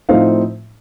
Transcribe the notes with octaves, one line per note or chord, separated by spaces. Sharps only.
A2 F3 A3 C4 D#4 F5